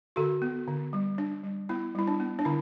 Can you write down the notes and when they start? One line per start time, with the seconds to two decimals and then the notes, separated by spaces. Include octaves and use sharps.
0.16 D3 F#4 A4
0.42 B3
0.67 D3
0.93 G3
1.18 D4
1.43 G3
1.69 B3 E4
1.95 G3 E4
2.08 D4
2.20 B3
2.39 D4
2.45 D3 E4